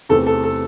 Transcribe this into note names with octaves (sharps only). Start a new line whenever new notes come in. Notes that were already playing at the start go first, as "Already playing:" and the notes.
E2 C3 E3 A3 C4 A4
A4
A4